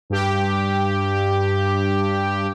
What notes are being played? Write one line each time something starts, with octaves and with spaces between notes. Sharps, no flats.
G2 G4